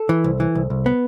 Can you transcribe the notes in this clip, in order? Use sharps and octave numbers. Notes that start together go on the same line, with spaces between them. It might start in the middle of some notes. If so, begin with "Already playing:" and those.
Already playing: A4
E3
C2
E3
C2
C2
B3